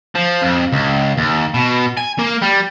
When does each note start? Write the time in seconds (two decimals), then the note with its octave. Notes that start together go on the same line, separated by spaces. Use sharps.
0.15 F3
0.42 F2
0.73 C#2
1.17 D#2
1.54 B2
1.97 G#5
2.19 A#3
2.42 G3